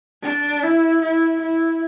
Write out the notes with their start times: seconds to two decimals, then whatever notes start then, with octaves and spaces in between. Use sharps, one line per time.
0.23 D4
0.63 E4
1.01 E4
1.41 E4